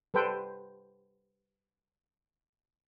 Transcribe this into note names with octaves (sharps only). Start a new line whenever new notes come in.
G3 A4 B4 C5 G5